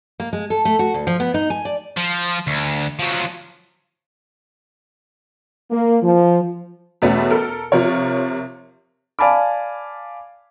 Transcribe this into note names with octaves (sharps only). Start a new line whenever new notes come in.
A#3
G#3
A4
A3
F#4
D2
F3
B3
D#4
G#5
D5
F3
D2
F3 F#3
A#3
F3
E2 B2 A3 B3 C#4
A4 A#4
C3 F3 A#4 C#5
D5 F5 G#5 A5 B5 D6